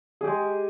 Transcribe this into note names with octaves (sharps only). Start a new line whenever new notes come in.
G#3 G4 G#4